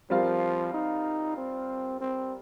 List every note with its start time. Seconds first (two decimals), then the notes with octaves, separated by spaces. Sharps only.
0.10 F3 G3 C4 F4 A#4 F5
0.74 D#4
1.37 C4
2.01 C4